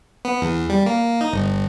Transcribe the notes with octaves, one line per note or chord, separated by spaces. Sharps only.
B3
E2
G3
A#3
D#4
G1